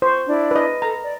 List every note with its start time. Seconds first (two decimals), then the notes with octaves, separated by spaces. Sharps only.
0.02 C5 C#6
0.27 D4 E4 D5
0.51 B4 D#5
0.82 A4 A#5
1.04 D5